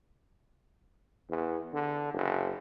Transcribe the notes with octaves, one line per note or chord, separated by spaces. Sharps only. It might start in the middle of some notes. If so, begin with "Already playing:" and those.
E2
D3
F#1